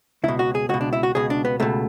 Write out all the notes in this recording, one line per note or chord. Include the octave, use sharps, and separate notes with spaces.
C#2 B2 E4
F#4
G#4
C#2 B2 F#4
D4
E4
F#4
C#2 B2 G#4
D4
B3
C#2 B2 A3